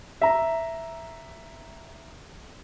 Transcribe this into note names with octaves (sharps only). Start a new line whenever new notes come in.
E5 A#5